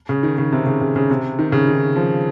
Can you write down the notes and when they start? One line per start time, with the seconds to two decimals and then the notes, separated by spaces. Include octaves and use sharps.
0.09 C#3
0.23 D#3
0.38 C#3
0.52 C3
0.66 C#3
0.81 C#3
0.96 C#3
1.10 C3
1.39 D#3
1.52 C#3
1.68 D#3
1.96 F3